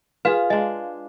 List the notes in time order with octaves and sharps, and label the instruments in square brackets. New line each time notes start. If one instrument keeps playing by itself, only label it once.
[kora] F4 G#4 [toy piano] B4 F5
[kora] G#3 D4 [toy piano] D#5